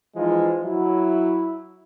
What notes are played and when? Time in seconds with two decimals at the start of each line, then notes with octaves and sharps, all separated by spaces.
0.16 E3 F3 G#3 D#4 F4
0.64 F#3 E4